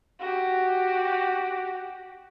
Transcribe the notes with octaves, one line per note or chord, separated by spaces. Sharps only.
F#4 G4